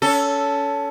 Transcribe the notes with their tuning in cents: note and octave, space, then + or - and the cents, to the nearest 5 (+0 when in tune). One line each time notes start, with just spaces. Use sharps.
C#4 +25 A4 +0